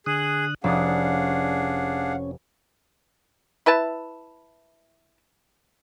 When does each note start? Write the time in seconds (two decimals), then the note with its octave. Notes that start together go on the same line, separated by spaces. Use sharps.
0.06 D3 G#4 D#6 F#6
0.64 F1 C#4 D4 G#4 D5 F5 F#5 D#6
3.66 E4 B4 E5 A5